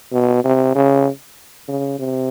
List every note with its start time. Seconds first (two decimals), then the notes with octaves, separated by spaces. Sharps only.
0.12 B2
0.44 C3
0.75 C#3
1.68 C#3
1.99 C3